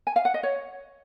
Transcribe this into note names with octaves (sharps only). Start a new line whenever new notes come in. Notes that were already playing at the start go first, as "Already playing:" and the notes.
G#5
F5
F#5
D#5
C#5